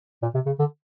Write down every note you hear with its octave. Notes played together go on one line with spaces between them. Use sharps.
A#2
C3
C#3
D3